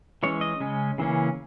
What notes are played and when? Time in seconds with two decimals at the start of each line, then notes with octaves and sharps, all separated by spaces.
0.23 E3 G#3 C#4 C#5
0.41 D#5
0.60 C#3 G#3 C#4
0.98 C#3 E3 A#3 C#4